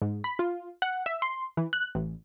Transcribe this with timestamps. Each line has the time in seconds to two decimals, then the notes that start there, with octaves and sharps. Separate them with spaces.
0.02 G#2
0.24 B5
0.39 F4
0.82 F#5
1.06 E5
1.22 C6
1.57 E3
1.73 F#6
1.95 A1